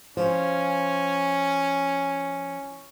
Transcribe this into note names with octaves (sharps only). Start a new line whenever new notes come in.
F3 C#4